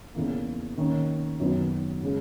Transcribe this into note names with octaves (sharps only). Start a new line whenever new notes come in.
E2 C#3 E3 A#3
D#3 A#3 C#4
F#2 D#3 F#3 B3
C#3 G#3